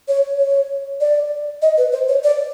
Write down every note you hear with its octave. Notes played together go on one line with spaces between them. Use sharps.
C#5
C#5
D5
D#5
B4
C5
C#5
D5